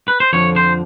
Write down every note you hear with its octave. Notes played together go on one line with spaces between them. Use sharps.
B4
C5
F2 D3 F3 C#5
C5